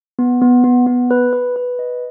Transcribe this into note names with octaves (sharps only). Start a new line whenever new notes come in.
B3
B3
B3
B3
B4
B4
B4
D#5